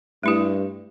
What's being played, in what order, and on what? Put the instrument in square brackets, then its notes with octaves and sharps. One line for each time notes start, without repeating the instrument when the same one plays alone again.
[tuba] G2 [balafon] A3 E4 G4